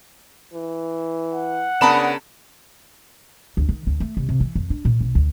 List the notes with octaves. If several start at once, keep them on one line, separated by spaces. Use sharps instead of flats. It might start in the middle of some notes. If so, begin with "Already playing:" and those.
E3
F#5
C#3 B3 D4 A#4 A5 B5 E7
D2
D#3
D2
A3
C2
C3
E3
F2
D4
A#2
B1
D2